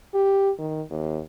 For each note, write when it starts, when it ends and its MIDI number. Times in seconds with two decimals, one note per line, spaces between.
0.14 0.50 67
0.59 0.81 51
0.90 1.21 39